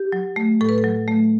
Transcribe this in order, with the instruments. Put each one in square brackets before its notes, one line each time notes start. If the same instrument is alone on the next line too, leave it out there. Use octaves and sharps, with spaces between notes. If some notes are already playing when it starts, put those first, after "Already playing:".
Already playing: [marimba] G4
F#3
A3
A2 A4
B4
A4
F#3
A3